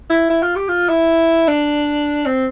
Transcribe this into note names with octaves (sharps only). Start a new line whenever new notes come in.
E4
E4
F4
G4
F4
E4
D4
C4